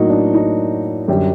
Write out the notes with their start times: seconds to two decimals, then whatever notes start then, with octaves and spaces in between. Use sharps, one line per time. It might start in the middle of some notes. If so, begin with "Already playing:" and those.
Already playing: A2 F#3 A#3 D#4 F#4
0.09 D4
0.34 D#4
1.08 F#2 D3 G3 G4